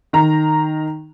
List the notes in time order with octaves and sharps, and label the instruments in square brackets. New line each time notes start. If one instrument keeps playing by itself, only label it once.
[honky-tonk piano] D#3 A#5